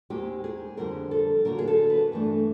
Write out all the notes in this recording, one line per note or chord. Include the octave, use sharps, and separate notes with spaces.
D#2 D#3 G#3 C4 D#4 G4
G#4
F2 D3 G3 C4 A#4
A4
D3 F#3 A#3 D#4 A#4
G#4
A4
B4
G2 E3 A3 D4